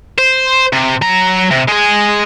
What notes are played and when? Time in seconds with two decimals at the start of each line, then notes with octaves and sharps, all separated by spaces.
0.18 C5
0.73 C3
1.02 F#3 A#5
1.51 C3
1.68 G#3 G#4